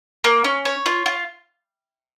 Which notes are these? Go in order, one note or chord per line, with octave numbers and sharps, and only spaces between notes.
A#3
C#4
C#5
F4
F4